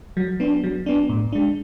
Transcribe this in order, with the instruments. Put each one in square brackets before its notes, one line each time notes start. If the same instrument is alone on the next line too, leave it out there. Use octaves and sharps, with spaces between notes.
[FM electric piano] F#3
B3 D4
F#3
B3 D4
A2
G#3 D4